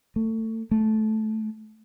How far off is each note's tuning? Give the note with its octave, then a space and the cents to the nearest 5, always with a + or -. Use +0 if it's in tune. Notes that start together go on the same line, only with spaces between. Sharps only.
A3 +25
A3 -15